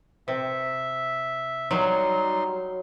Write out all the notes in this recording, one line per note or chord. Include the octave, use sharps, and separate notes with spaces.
C3 E5
F#3 G3 D#4 C6